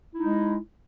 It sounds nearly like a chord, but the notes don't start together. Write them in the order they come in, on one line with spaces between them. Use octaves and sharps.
E4 D#4 G#3